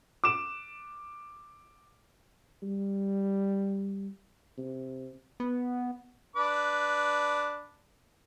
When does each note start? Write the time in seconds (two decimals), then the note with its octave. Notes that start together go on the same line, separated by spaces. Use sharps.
0.24 D6 E7
2.63 G3
4.58 C3
5.40 B3
6.36 D4 B4 D6